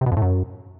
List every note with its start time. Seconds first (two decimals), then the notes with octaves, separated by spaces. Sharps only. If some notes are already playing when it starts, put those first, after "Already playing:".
0.01 C3
0.06 B2
0.12 F2
0.17 A2
0.22 F#2